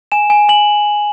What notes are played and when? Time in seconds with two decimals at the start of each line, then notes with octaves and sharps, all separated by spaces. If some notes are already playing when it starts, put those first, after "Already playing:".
0.12 G#5 E7
0.30 G#5
0.49 G#5 F#7